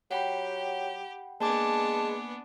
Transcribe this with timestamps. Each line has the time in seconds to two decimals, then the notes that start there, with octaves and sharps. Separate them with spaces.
0.11 F#3 G4 F#5 G5 B5
1.40 G#3 A#3 B3 D4 G#5 A5 D6